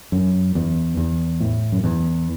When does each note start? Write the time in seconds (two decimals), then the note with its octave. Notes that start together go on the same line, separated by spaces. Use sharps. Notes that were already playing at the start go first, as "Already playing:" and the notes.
0.12 F#2
0.55 E2
0.97 E2
1.40 A2
1.72 F#2
1.84 E2